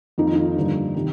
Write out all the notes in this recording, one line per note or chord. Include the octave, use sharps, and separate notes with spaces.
F2 D#3 A#3 D#4
F4
D#4
G2 D3 F3 A#3
C3 D#3